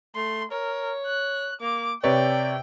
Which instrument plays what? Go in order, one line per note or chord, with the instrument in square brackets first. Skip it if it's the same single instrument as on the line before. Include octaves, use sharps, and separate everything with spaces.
[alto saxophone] A3 [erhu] C6
[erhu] A#4 [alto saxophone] C#5
[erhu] F#6
[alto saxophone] A#3 [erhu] D6
[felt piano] C3 B4 C#5 [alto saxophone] D5 [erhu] G5